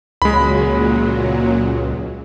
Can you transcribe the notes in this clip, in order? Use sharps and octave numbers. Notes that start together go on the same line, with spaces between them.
C#2 A#2 F#3 G#3 B5